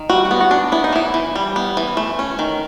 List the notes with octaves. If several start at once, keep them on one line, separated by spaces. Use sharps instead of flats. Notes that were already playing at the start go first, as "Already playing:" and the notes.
Already playing: D#3
G3 F#4
F#4
B3
F#4
D4
B3 E4
D#4
E3 E4
E3
G3
B3
E3
A3
C#4
D#3